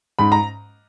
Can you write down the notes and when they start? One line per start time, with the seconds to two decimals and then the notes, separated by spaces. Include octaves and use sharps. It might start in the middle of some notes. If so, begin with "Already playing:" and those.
0.19 G#2 B5
0.32 A#5